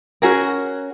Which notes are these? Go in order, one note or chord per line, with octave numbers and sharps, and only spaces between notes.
C#4 F#4 G#4 A#4